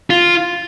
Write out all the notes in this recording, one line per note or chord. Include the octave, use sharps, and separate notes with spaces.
F4